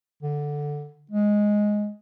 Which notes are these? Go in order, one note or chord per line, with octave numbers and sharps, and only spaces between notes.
D3
G#3